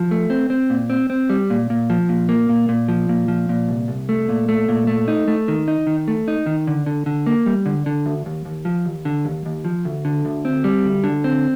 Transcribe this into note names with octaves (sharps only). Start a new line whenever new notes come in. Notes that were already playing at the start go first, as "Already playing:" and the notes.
Already playing: F3
A3
C4
C4
A#2
C4
C4
G3
A#2
A#2
F3
A#2
A#3
A#2
A#2
F3
A#2
F3
A#2
C2
C2
A3
A#2
A3
A#2
A3
D#4
A3
D#3
D#4
D#3
A3
D#4
D#3
D3
D3
D3
A#3
G3
D3
D3
D2
D#2
D#2
F3
D#2
D3
D#2
D#2
F3
D2
D3
D2
C4
G3
D2
D3
C4